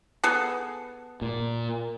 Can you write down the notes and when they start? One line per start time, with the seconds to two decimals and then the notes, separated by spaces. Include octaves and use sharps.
0.24 B3 G#4 A4
1.22 A#2